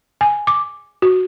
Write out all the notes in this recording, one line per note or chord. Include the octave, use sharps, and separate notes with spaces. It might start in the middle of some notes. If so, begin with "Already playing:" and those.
G#5
D6
F#4